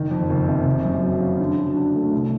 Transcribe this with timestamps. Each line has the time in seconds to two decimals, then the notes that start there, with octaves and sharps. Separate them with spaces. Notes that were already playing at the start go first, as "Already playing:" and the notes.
Already playing: F#1 D#3
0.11 F2
0.30 F#1
0.48 C3
0.66 F#1
0.85 F#2
1.04 F#3
1.21 C#3
1.40 D3
1.58 F#3
1.76 D4
1.95 A3
2.13 C2